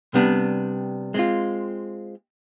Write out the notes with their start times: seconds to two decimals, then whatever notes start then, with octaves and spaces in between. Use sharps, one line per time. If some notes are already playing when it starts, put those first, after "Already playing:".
0.14 C3 G3 B3 D4
1.14 G#3 C4 F4